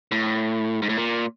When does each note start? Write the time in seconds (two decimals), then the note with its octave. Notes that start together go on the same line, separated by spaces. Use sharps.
0.12 A2
0.82 G#2
0.89 A2
0.97 A#2